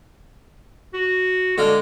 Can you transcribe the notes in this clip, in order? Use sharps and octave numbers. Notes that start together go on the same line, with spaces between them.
F#4
D3 G#3 D5 F5